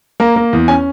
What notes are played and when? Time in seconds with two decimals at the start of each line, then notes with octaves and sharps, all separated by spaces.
0.20 A#3 A#5
0.36 A#3
0.53 E2
0.68 C#4 G#5